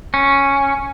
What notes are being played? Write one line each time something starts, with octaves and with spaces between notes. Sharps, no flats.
C#4